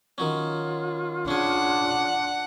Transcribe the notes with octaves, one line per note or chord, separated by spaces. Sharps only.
D#3 F#3 C#4 F4
C#4 D4 G#4 F#5